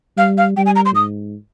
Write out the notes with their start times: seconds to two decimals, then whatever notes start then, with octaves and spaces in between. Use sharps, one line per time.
0.17 G3 F5
0.38 F5
0.57 G3 G5
0.66 G#5
0.75 A#5
0.85 C6
0.95 G#2 D#6